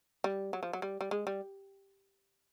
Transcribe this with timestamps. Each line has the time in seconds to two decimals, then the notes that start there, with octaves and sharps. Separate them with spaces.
0.24 G3
0.53 F#3
0.63 F3
0.73 F#3
0.82 G3
1.01 G3
1.11 G#3
1.27 G3